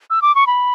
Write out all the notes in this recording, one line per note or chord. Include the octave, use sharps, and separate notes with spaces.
E6
D6
C#6
B5